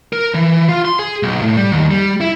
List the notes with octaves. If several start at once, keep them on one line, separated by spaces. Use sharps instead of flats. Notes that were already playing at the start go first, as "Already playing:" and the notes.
A#4
E3
F4
C6
G#4
B1
A2
G3
D#2
G3
E4